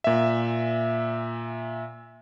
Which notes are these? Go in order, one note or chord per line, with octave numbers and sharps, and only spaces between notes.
A#2 E5